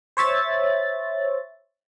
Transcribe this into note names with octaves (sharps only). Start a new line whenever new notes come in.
C5 C#5 E5 A6